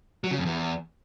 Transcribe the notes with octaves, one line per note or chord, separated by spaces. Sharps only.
F#3
C#3
F2
E2